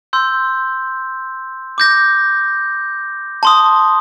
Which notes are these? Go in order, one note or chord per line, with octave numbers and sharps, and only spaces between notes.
C6 E6 G6
D6 G6 A#6
A5 C6 D#6